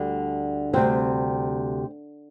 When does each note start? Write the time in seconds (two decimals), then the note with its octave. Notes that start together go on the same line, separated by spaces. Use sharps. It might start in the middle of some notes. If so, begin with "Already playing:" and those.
Already playing: D2 D3 G3
0.73 D2 C3 G3 C4